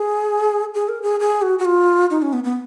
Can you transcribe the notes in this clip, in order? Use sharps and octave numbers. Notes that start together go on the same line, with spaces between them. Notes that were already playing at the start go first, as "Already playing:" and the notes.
Already playing: G#4
G#4
A#4
G#4
G#4
F#4
F#4
F4
D#4
C#4
B3
B3